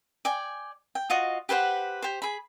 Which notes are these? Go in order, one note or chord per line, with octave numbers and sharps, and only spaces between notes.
D5 G5 G#5
G5
F4 F#4 D#5
G4 B4 C5 F#5
G4 C5
G#4 B5